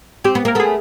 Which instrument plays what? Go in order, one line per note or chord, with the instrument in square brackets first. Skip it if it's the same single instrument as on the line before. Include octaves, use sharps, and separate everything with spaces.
[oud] C4 [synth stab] G4
[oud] B3
[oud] A#3 [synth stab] A#4
[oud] A3 B3 [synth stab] G#4